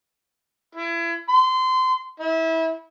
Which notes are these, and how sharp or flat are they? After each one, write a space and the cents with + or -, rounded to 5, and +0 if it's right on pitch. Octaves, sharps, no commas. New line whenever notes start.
E4 +35
C6 -25
E4 -25